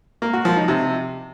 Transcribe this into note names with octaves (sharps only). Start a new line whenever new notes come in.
A#3
F#4
F3
D#4
C3